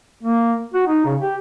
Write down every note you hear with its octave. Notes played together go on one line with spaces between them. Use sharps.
A#3
F#4
D#4
C#3
G4